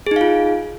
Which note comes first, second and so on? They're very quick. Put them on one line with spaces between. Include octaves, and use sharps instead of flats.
G#4 D#4 F5 F4